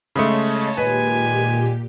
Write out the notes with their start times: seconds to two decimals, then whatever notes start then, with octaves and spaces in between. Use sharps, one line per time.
0.16 C#3 G#3 A3 C#5 D#5 A5
0.77 D#2 A#2 G#3 G4 B4 G#5